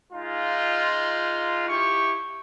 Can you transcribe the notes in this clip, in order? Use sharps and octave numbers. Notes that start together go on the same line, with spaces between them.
G#3 D#4 F4
E4 G4 C#6